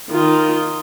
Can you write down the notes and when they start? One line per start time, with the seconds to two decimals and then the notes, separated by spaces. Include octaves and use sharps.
0.10 D#3 F4